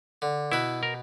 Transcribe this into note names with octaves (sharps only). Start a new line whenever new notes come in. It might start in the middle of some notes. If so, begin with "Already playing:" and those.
D3
B2 E4 B4
A#4